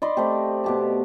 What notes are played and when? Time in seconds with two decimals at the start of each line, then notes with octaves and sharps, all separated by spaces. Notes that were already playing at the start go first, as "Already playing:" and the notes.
0.02 D5 D#5 B5 C6
0.17 A3 C4 G4
0.64 B2 G4 A5